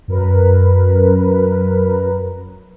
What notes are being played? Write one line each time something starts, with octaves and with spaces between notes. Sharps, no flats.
F#2 A#4 B4